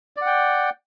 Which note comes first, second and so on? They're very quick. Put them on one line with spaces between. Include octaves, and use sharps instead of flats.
D5 F#5 G5